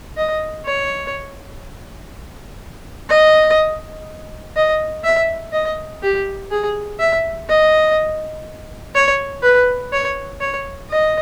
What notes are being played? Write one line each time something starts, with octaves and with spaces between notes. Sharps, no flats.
D#5
C#5
D#5
D#5
E5
D#5
G4
G#4
E5
D#5
C#5
B4
C#5
C#5
D#5